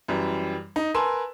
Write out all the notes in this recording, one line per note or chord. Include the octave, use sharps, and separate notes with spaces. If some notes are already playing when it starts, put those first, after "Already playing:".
F#2 E3 G3
D#4
A#4 B4 G#5 A5 C6 E6